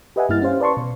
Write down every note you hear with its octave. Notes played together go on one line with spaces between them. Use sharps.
G4 B4 D#5 E5 F#5 G#5
G2 A#3 E4 F6 A6
C#4 G4 C5 F5
B4 D5 A5 C6 C#6
B2